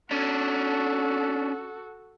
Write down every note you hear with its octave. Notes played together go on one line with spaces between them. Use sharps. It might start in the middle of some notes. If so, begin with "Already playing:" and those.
C#4 D4 F#4 A4